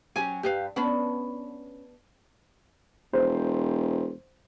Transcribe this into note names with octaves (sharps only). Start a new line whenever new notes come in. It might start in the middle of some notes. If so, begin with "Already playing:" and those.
F#3 C#4 G4 G#5
G2 G4 B4 F5
B3 C#4 D4 B5
E1 C5